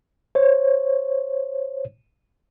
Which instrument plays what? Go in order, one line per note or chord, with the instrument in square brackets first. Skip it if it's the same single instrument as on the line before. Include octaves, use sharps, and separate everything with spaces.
[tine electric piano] C5 C#5